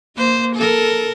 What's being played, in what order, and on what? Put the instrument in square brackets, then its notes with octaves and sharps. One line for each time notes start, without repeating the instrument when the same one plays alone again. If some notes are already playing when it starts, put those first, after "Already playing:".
[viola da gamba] A#3 C5
A4 A#4